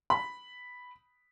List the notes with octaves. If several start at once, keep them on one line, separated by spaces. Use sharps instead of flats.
B5